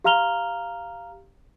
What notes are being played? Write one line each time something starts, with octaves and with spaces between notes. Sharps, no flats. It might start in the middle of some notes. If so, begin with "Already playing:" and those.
G4 F5 A#5 F6 F7 G7